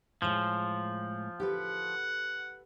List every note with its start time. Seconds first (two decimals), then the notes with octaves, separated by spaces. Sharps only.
0.22 A2 F3 G#3
1.40 G4 A4 B4 F#5